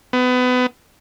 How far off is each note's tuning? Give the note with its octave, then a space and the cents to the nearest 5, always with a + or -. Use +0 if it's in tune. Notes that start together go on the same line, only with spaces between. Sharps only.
B3 +25